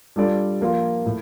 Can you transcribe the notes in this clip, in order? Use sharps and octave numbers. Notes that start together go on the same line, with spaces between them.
G3 D4 F4 A4 D5
F3 A#3 F4
A2